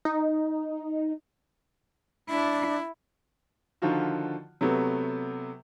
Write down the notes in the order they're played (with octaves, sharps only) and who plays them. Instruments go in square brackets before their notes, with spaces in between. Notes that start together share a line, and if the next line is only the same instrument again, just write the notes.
[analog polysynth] D#4
[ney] D4 [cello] E4
[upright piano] D3 D#3 F3 F4 F#4
C3 F#3 A3 B3